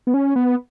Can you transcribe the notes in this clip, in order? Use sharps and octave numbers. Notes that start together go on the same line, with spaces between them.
B3
C#4
B3